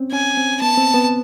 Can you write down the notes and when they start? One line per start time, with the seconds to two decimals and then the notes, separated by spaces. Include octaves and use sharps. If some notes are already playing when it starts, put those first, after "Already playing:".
Already playing: C4 C#4
0.12 C#4 G#5
0.37 C4
0.61 B3 A5
0.77 C4
0.94 B3